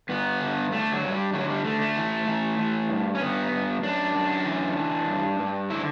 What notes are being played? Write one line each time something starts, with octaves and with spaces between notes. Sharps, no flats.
G2 B3
D3
D3 A3
F#3
G2
G3
D3 F#3
G3
D3 A3
A3
E3
E3
E3
G2
C#4
G2 B3
G2
F#2 D4
F#2
E3
E3
G2
G2
D3 E4